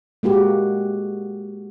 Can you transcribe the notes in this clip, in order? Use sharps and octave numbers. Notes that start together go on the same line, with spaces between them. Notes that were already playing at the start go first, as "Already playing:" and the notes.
G#3 A#3 F#4 G4